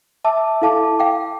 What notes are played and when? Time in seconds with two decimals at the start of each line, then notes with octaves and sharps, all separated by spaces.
0.25 E5 A5 D6 E6
0.62 E4 A4 F5 A5 D6
0.99 F5 G5 D6